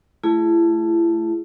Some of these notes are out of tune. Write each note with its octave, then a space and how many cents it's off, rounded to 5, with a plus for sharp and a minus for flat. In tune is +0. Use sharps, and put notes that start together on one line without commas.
A3 +0 E4 +35 G#4 +0